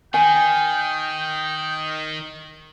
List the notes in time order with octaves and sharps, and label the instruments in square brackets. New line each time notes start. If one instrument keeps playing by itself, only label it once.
[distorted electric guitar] D#3 [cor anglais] G5 [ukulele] G#5